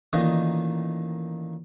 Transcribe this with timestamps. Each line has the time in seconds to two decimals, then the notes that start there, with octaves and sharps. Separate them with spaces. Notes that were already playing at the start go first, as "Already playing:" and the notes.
0.13 A1 A#2 D#3 D#4 D#5